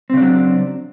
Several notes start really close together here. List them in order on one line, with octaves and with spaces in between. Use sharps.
C4 C#3 D4 F#3